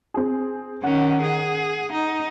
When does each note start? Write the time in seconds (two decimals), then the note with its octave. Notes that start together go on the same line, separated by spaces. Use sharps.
0.14 C4 G#4
0.84 D#3 C#4 F#5
1.23 G#4
1.93 D#4